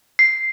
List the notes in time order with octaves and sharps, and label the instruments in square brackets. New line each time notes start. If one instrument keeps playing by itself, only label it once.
[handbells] C7